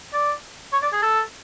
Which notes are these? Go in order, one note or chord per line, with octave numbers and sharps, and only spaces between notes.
D5
C#5
D5
G#4
A4